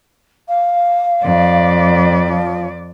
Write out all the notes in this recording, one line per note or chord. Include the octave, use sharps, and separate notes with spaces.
F5
F2 D5
F3